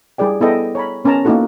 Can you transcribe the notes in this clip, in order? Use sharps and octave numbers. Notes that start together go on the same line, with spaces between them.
G3 E4 G#4 D5 G5
B3 E4 G#4 A4 D#5 G5
C#5 A#5 B5
B3 C#4 A#4 A5 A#5
A#3 B3 D#4 E4 F#4 A4